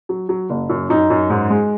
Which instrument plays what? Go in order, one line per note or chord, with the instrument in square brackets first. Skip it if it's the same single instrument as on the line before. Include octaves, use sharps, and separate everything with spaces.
[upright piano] F#3
F#3
F#1
F#2
F#2 D#4
F#2
G#2
G#3